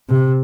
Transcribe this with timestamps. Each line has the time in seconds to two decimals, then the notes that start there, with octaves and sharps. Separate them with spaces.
0.09 C3